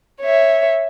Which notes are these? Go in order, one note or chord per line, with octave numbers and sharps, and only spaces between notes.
C#5 E5